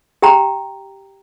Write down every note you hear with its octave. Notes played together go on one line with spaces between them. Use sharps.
G4 G5 A#5